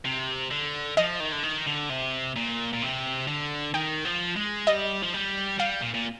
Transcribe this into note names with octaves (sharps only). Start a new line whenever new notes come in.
C3
D3
F3 D#5
D#3
D3
D#3
D3
C3
A#2
A#2
C3
D3
D#3 G5
F3
G#3
G3 D#5
F3
G3
G3 F5
A#2
A#2